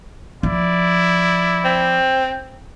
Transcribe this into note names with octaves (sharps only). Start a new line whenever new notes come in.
F3 E4 D5
C4